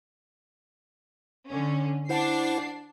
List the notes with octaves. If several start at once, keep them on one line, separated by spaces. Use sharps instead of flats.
D3 C#4
D4 E4 C5 F#5 C7